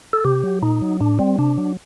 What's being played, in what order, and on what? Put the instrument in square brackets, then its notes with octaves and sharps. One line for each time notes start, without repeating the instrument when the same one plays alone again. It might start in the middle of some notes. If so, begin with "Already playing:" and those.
[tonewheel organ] A4
C3 G4
F#3
A#2 D#4
F#3
A2 D4
G3 C4
C3 D4
F#3